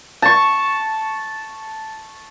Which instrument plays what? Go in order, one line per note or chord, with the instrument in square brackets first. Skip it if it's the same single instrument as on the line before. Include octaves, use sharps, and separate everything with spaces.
[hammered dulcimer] A5 C#6